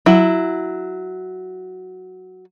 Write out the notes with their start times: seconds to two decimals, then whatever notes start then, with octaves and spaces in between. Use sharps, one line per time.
0.06 F#3 E4